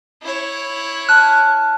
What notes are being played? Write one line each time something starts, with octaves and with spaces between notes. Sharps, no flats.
E4 C#5
A5 F6 F#6